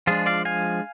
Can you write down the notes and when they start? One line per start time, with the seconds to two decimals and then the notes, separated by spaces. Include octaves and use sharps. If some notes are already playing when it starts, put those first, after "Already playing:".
0.07 F3 G#3 D4 F4 G#4
0.26 D5 F5
0.45 F5 G#5